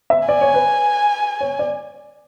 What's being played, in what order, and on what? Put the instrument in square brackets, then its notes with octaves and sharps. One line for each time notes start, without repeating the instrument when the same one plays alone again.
[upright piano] E5
[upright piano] D5 [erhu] G#5
[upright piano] C#5
B4
C#5
D5